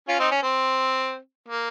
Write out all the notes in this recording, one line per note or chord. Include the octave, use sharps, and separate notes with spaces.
C#4 F4
C4 D#4
C#4
C4
A#3